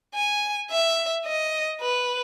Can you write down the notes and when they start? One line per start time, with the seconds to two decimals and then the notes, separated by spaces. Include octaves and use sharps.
0.15 G#5
0.71 E5
1.26 D#5
1.81 B4